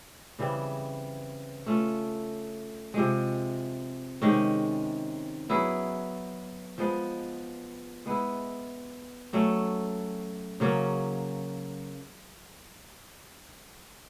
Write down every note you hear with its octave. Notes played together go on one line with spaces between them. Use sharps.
C#3 E3 G3 C4
A3 C#4 F4
C3 F3 G#3
C3 D#3 G#3 C#4
F#3 B3 E4 G#4
F3 G#3 B3
G#3 B3 E4
F#3 A3 C#4
C#3 F#3 A#3 C#4